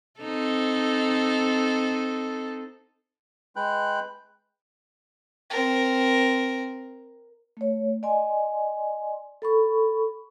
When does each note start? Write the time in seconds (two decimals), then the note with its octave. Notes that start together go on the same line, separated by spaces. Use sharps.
0.20 C4 D#4 A4
3.56 G#3 B4 G5 F#6
5.50 C4 A#4
7.57 A3 C#5
8.03 D5 D#5 G#5 C6
9.42 A4 B5 C#6